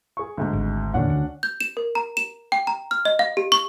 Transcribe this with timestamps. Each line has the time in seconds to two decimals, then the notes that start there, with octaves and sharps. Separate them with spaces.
0.17 G#4 C#6
0.37 D2 G#2
0.53 G#1
0.94 E2 A#2 D3 C#4 D4 F#5
1.10 D2
1.43 G6
1.60 E7
1.77 A#4
1.95 A#5
2.17 E7
2.52 G5
2.67 A#5
2.91 F6
3.05 D#5
3.19 F5
3.37 G4
3.52 C#6